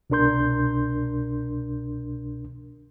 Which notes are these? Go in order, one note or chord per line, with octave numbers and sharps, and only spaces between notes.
C2 B2 D4 A#4 C6 G6